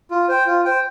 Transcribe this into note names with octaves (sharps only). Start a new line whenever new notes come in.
F4
C5 G5
F4
C5 G5